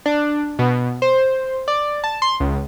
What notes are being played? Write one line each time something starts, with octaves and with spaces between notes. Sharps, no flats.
D4
B2
C5
D5
A5
C6
C#2